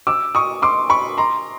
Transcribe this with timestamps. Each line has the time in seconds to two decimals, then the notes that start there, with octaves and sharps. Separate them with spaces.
0.07 D6 E6
0.35 C#6 D#6
0.62 C6 D6
0.90 B5 C#6
1.17 A#5 C6